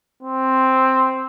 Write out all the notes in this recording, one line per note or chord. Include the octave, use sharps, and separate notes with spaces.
C4